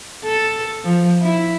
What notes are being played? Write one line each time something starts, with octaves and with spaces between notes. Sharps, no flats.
A4
F3
E4